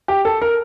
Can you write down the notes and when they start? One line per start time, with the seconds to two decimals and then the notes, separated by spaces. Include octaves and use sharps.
0.08 G4
0.25 A4
0.42 A#4